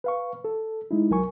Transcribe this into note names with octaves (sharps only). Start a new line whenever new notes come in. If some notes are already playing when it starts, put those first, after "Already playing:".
B4 F5 C#6
A4
G#3 D#4 E4
C2 F#3 A#4 G#5 C#6